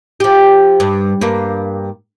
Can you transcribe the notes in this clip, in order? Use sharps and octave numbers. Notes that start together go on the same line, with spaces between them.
F3 G4
G2
G2 A#3